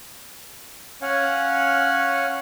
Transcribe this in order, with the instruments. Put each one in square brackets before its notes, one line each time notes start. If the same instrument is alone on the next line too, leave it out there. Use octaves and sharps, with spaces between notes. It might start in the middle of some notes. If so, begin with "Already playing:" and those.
[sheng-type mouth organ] C#4 C#5 F5 F#5 G#5